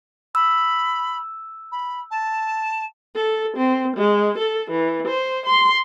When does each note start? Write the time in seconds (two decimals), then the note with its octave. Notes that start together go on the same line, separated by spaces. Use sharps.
0.35 B5 E6
1.72 B5
2.11 A5
3.16 A4
3.57 C4
3.97 G#3
4.38 A4
4.71 E3
5.07 C5
5.46 C6